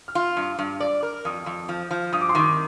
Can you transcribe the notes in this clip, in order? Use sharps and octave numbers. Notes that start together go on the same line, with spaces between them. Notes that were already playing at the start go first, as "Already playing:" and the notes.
F6
F4
G2
G2
D5
A#4
F2 D#6
F2
F3
F3
G2 D#6
D6
C6
D#3 D6